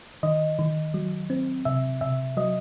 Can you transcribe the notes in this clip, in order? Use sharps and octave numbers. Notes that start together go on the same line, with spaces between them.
D#3 D#5
D#3
F#3
C4
C3 E5
C3 E5
F#3 D#5